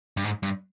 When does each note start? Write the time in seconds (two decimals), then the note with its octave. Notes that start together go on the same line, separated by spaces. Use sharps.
0.17 G2
0.24 G#2
0.43 G2